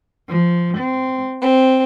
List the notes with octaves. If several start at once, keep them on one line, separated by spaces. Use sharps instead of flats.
F3
C4
C4